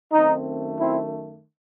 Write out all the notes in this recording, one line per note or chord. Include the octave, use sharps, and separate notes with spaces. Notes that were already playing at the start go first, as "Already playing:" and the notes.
F#2 D#3 A3 C4 D#4
C4 E4